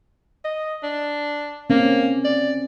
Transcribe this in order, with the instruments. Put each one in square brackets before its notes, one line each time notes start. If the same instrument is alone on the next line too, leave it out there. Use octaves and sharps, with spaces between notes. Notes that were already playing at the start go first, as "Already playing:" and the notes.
[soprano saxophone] D#5
D4
[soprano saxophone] A#3 [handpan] C4 C#4
[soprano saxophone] D5